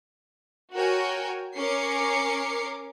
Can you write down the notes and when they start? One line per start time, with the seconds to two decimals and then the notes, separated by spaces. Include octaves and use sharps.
0.74 F#4 A#4 C#5 G5 G#5
1.55 C#4 A#4 C#5 D6 C7 C#7